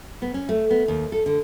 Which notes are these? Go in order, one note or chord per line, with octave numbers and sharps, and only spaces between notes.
B3
C#4
A3
B3
D#2
A4
D3